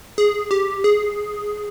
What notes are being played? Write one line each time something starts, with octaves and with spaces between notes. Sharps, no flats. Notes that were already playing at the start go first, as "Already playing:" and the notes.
G#4
G4
G#4